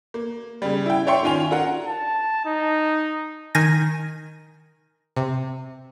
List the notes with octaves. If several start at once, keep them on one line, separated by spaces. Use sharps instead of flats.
A#3
C#3 G3
E4 G5
C#5 D5 E5 G5 C6 C#6
D#3 C#4 F4 G#5 F7
D4 F4 A#4 F#5
A5
D#4
D#3 G#5 A#6
C3